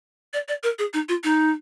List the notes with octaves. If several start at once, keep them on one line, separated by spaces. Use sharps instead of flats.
D5
D5
A#4
G#4
D#4
F4
D#4